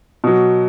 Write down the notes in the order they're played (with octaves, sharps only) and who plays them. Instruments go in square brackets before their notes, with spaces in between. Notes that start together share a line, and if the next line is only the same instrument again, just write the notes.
[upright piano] B2 F#3